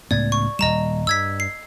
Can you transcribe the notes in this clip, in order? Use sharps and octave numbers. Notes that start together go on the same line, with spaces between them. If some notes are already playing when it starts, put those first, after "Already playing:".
C#2 A2 B3 D5 G#6
C#6
D#1 G3 D#5 A#5 E7
G2 E6 G#6 B6
C7